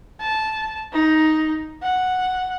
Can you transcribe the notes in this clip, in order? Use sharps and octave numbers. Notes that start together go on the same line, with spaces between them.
A5
D#4
F#5